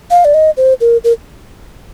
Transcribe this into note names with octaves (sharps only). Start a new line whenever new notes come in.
F5
D5
D#5
C5
A#4
A#4